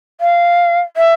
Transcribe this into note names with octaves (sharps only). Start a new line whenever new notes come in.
F5
E5